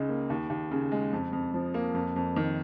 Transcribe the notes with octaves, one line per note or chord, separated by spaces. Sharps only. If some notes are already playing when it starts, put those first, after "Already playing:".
Already playing: C#2 C#3 D#4
A#3
D#2
D#2
C#3
G#3
F2
F2
F3
A#3
F2
F2
D#3